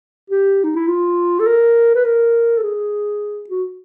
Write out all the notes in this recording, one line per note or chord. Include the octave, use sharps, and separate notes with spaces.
G4
D#4
E4
F4
A4
A#4
B4
A#4
A4
G#4
F#4